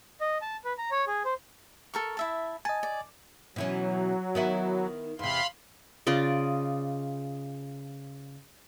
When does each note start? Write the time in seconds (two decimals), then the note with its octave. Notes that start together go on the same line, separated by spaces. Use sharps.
0.21 D#5
0.42 A5
0.65 B4
0.78 A#5
0.91 C#5
1.07 G#4
1.25 C5
1.94 A4 A#4 C#6
2.17 E4 E5 A5
2.65 D#5 G#5 A5
2.83 D5
3.56 B2 E3 F#3 C#4
4.35 D#3 B3 E4
5.19 E2 C3 F5 B5 C6
6.07 C#3 F4 D5 D#5